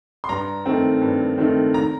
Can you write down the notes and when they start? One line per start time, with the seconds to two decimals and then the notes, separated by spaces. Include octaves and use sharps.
0.24 C6
0.29 G2 A#5
0.66 D#3 A3 C4
1.02 G2
1.38 D#3 A3 C4
1.74 A#5